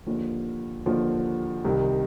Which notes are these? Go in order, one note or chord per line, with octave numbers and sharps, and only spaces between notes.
D#2 D3 F3
D#2 D3 F3
C2 C3 D#3